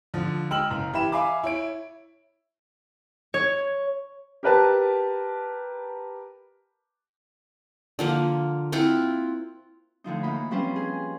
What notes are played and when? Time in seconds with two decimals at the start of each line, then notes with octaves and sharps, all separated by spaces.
0.14 D3 F3
0.51 G#3 G5 E6 F6 F#7
0.70 F#1 A#5 F6
0.93 E3 G4 E5 B5 E7
1.12 E5 F5 G#5 B5 D6
1.43 E4 C#5 D7
3.34 C#5
4.43 G4 A#4 B4 A5
7.99 D3 F3 A#3
8.72 C4 E4 F4 F#5
10.04 A2 D3 F3 D#4
10.23 E3 A#3 D#4 F#5 B5
10.51 F3 G3 C4 C#4 B4 C5
10.76 G#4